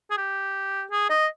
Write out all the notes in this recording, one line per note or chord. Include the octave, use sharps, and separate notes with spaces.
G#4
G4
G#4
D#5